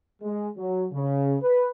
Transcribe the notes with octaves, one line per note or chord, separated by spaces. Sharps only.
G#3
F#3
C#3
B4